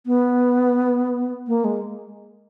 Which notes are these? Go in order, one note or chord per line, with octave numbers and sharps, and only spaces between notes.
B3
A#3
G#3